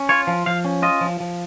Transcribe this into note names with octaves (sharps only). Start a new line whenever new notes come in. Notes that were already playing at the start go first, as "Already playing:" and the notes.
Already playing: C#4
F4 C#5
F3
F3 F5
C#4
F4 D#5
F3
F3